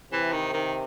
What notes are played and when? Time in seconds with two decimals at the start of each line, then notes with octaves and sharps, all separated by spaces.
0.12 C3 E3
0.32 D#3
0.53 D#3